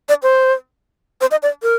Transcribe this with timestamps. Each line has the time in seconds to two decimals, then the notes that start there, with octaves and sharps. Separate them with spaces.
0.09 D5
0.23 C5
1.21 C5
1.31 D#5
1.43 D5
1.63 A#4